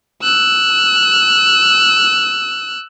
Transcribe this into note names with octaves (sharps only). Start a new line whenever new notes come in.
E6 F#6